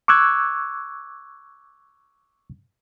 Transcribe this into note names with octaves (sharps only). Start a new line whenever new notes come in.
C#6 D6 E6 F#6 G#6